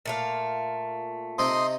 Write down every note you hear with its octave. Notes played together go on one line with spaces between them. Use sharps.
A#2 A3 F5
C3 C4 D#4 C6 D#6